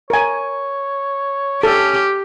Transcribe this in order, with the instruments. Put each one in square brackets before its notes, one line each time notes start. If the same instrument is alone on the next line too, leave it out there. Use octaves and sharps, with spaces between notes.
[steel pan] A#4 G#5 [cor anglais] C#5
[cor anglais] C#4 [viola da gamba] G4 [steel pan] A4